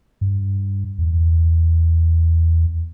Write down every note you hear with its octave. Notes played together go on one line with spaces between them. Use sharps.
G2
E2